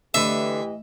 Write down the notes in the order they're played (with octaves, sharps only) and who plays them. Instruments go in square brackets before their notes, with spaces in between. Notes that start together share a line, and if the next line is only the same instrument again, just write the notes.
[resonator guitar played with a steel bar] D3 B4 [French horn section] E3 G4 D#5 [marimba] A3 [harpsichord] E5